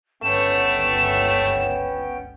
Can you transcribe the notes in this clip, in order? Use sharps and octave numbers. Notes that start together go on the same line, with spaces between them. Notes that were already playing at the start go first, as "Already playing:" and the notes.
G1 C#2 A3 B3 C#4 G5 E7